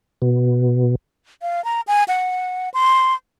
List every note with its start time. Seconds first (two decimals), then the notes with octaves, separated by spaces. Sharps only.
0.22 B2
1.42 F5
1.65 A#5
1.87 G#5
2.08 F#5
2.74 C6